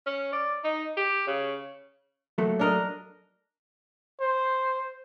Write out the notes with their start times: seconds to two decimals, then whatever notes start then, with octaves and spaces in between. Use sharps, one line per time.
0.07 C#4
0.33 D5
0.64 D#4
0.97 G4
1.27 C#3
2.38 F#3 A3 A#3
2.59 D4 A#4 D#5
4.21 C5